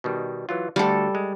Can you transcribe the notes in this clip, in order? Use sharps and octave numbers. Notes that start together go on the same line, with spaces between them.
B2 D#3 G3
E3 F#3 F4
D2 G3 F#4 A4 F5
G#3